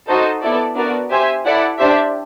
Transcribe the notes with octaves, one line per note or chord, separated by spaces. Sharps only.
D#4 F#4 A4 C5 D#5
B3 E4 A4 D5
B3 D4 F#4 A#4 D5
G4 C5 E5 G#5
E4 A4 D5 F#5
D4 G4 C5 E5